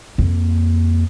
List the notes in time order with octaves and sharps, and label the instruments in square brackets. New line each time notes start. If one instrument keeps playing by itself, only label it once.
[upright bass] F2 A#3